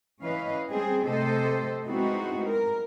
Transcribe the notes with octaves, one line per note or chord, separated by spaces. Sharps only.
E3 C#4 B4 D#5 F5
G3 C4 G#4
C3 A3 G4 A4 C5 D#5
G#3 B3 C4 D#4 E4 F#4
A#4